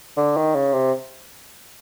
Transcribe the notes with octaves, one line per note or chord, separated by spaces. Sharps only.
D3
D#3
C#3
C3